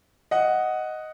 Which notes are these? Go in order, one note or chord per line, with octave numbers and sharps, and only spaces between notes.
D#5 F#5